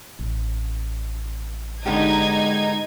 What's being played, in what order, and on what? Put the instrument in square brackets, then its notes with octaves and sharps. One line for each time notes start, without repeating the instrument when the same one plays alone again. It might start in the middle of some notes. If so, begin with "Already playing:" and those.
[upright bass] A1
[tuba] G#2 [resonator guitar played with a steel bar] D3 B3 G4 [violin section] D#4 G#6